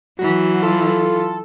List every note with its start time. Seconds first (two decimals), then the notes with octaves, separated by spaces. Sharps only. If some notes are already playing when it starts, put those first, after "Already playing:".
0.19 E3 F#3 F#4
0.63 F4 A4